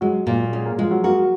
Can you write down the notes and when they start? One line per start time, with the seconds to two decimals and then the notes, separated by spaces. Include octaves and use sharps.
0.01 F#3 G#3 F#4
0.27 A#2 A#3 A#4
0.53 G#3 C#4 G#4
0.65 A#3 A#4
0.78 F3 G#3 F4
0.91 F#3 F#4
1.04 A#3 F#4 A#4